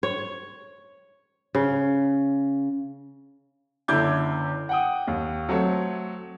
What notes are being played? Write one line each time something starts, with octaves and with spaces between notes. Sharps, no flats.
C#5
C#3
F#1 D3 E4 D6 G6 G#6
F#5 G5 D#6
D#2
F#3 A3 C4 C#5